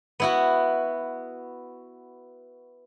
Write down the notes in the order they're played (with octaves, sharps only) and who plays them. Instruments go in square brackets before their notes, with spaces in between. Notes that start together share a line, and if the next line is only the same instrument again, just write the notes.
[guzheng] B3 E4 F#4